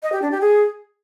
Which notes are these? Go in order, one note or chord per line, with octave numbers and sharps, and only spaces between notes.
D#5
G4
D4
G4
G#4